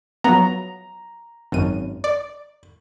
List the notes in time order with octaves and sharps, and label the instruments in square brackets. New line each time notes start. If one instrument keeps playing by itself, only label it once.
[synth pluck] F#3 B3 [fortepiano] A#5
[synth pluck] G#1 F#2 D#7
D5